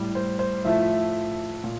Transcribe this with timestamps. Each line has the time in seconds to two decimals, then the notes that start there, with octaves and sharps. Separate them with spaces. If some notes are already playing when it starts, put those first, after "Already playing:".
Already playing: A2 G3
0.15 C5
0.39 C5
0.65 A2 F3 A3 E5
1.64 A#2